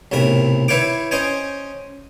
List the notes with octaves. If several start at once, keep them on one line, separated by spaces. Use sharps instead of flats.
B1 A2 C3 A#4 B5
E4 B4 C#5 F5 G5 D6
C#4 C5 D#5 G5 G#5